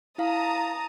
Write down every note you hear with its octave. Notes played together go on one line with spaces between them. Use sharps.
E4 F5 A5 A#5 D#6